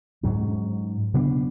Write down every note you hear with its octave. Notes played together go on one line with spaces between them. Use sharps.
G#2 F#3 C#4
C#3 F#3 B3 D4